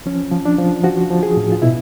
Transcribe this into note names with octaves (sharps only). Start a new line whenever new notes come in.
F3 C#4
F3
D4
F3
F3 F#4
F3
G#4
A2
F4
B2 E4